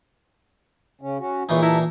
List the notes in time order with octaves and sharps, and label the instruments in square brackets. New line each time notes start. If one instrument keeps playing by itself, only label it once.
[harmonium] C#3 C#4
C#4 F#4
[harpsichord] A#2 E3 D#4 [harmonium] G#3 E4 C#5
[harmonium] G3 A4 A#5 [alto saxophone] E4